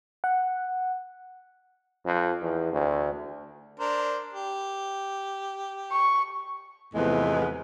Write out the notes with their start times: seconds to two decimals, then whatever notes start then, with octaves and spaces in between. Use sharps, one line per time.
0.24 F#5
2.06 F2
2.41 E2
2.73 D2
3.80 D4 A#4 C5
4.33 G4
5.92 C#6
6.94 E2 A2 C3 F3 G#3 B3